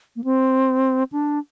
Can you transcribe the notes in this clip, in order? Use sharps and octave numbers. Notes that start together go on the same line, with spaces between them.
A#3
C4
D4